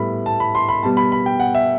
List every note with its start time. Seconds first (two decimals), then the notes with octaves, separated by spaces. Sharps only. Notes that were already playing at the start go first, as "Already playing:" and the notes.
Already playing: A2 G3 B3 B5
0.26 A5
0.40 B5
0.55 C6
0.68 B5
0.83 B2 G3 B3 A5
0.97 B5
1.12 B5
1.26 G5
1.40 F#5
1.55 E5